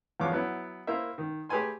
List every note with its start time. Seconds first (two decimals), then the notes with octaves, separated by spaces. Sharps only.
0.20 E2 F3 B3 C#5 F5 D6
0.32 F#3 B3 E4
0.87 A#3 E4 A#4 C5 E5
1.18 D#3
1.49 A3 G4 G#4 B4 G#5 C6